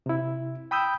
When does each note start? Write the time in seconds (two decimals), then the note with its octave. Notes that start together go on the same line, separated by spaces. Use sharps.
0.06 C3 E4
0.71 G5 B5 D#6 E6 G6